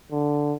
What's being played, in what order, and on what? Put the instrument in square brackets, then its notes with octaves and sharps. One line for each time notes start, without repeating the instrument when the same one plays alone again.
[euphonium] D3